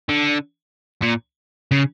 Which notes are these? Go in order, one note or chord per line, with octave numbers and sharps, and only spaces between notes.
D3
A#2
C#3